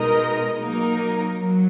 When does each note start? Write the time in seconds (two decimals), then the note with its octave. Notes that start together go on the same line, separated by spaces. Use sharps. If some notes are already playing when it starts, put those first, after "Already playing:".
Already playing: B2 G#3 D#4 A#4 D#5
0.58 F#3 A#3 D#4 A#4
1.38 F#3